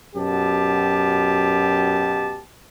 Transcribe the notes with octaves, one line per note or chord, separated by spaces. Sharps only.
F#2 B2 G4 A5